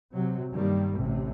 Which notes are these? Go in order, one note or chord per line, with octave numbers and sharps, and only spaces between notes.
C3 F#3
G2 D#3 G3 A#3
A1 D2 A2 C3